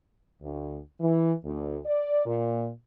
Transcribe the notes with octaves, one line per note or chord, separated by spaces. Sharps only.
D2
E3
D2
D5
A#2